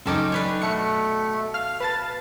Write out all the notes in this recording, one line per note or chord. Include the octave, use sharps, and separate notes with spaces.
C#2 F#2 C4 C#4 D#4 A4 D6
D4 B4 C#5
B2 A3 C#7
F5 F6
B4 A5 A6